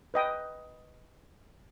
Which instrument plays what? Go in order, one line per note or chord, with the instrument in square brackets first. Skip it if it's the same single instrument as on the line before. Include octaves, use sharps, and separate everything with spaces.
[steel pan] B4 D#5 G5